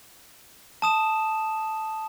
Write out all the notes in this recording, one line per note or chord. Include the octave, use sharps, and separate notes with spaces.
A5 D#6 E7